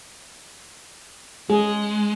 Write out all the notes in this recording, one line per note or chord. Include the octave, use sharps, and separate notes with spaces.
G#3 G#4